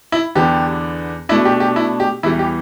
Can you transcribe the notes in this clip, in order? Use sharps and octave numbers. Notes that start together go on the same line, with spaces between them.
E4
E2 D3 B3 D4 G4
B2 A3 D4 E4
G4
G4
E4
G4
E2 E3 G3 E4
G4